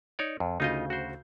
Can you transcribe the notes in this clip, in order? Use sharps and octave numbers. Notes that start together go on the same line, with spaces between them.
D#4 C#5 D5
F2
D2 C#3 D#4 F4 D#5 G6
F#4 C5